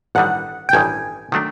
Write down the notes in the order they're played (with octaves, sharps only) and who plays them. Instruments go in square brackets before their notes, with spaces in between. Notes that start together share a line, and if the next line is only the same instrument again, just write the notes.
[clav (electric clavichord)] A1 G2 D#3 G3 [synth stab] F#5
[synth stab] G5
[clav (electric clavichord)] A1 G2 D#3 G3 [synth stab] G#5
[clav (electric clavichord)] D#3 F#3 A3 D4